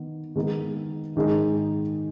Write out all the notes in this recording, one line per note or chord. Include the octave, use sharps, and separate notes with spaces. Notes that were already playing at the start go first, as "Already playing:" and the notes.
Already playing: D#3 B3
D#3 G#3 B3 D#4
G#2 D#3 G#3 D#4 G#4